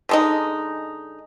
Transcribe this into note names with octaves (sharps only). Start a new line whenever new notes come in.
D3 G#3 D#4